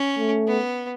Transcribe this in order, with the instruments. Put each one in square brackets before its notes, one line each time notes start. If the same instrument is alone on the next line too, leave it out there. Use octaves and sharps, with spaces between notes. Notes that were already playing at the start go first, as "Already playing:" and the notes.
Already playing: [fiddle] C#4
[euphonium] A3
[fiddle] B3